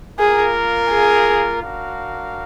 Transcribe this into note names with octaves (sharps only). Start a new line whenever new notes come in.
A#3 F4 G#4 A#4
G#4
D4 F#4 A#4 F5